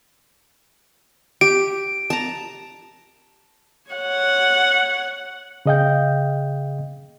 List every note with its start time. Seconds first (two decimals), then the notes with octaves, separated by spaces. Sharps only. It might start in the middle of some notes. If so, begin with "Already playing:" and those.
1.41 G4 D7
2.10 A5 A#5
3.91 C#5 F#5
5.66 C#3 G#4 D#5 F5 G5 G6